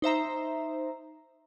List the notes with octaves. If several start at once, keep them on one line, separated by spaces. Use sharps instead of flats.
D#4 C5 E5 A#5